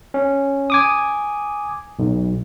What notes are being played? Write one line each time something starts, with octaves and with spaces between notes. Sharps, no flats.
C#4
G#5 D6 D#6
B1